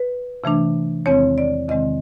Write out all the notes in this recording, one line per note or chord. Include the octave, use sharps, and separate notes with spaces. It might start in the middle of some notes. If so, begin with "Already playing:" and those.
Already playing: B4
C3 E3 A3 D4
E2 C3 D#3 G#3 C4 C#5
D5
E2 C3 D#3 G#3 C4 D#5